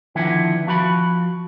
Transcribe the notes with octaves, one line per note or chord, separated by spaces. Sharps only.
D3 D#3 F3 B3 E4
F3 F#4 A#5 B5